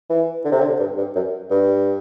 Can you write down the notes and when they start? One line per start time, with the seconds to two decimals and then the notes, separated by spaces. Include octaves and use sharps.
0.10 E3
0.45 D3
0.52 C3
0.60 D3
0.79 G2
0.97 G2
1.15 F#2
1.50 G2